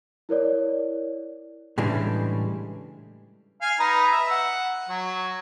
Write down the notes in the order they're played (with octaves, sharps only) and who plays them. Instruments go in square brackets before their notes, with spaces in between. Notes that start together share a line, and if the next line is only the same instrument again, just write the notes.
[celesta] E4 A#4 C#5 D5
[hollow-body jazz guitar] A2 C#3 E3 G3 G#3 D4
[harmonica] F5 G#5
D#4 B4 A#5
E5
F#5
F#3